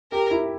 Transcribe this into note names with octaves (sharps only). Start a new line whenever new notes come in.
G4 A#4
E4